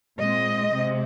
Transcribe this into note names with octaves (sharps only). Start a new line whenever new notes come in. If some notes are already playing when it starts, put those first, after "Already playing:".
A#2 G#3 C4 D#5
C3 G#3 C4